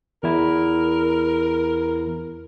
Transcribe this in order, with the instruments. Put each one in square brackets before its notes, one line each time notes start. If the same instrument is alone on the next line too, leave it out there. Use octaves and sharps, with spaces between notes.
[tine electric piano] E2 E4 [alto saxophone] A#4